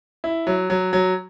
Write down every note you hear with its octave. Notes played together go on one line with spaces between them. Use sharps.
E4
F#3
F#3
F#3